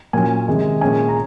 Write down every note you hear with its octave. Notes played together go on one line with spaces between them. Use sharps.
A#2 F#3 C#4 G#5
C3 D#3 G#3
A#2 G#3 C#4 G#5
A#5